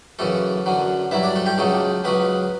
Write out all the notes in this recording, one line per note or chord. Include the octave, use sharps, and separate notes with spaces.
F#2 C#3 E3 A3 A4
F#2 D3 F#3
G2 F#3 E4 E5
D4 D5
A3 A4
G3 G4
C#2 C#3 F#3 A3 A4
C#2 C#3 F#3 B3 B4